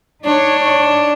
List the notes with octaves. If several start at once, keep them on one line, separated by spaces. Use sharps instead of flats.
D4 D#4 C#5